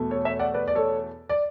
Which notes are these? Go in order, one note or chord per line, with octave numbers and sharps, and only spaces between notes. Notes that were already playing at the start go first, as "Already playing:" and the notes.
Already playing: E2 B2 A3
A4 C#5
C#5 E5
D5 F#5
B4 D5
D5
A4 C#5
D5